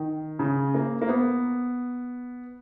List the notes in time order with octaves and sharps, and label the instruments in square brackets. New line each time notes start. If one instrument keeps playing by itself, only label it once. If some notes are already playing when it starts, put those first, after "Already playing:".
Already playing: [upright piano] D#3
C#3
A#3
A#3
B3